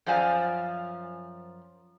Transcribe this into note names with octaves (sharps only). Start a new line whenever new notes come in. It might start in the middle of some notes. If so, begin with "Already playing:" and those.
F#2 F3 C5 D5 F5 G#5